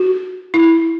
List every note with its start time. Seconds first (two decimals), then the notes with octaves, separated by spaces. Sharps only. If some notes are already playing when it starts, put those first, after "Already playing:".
Already playing: F#4
0.54 E4